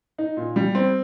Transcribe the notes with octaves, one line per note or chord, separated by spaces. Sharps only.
D#4
A#2
G3
C4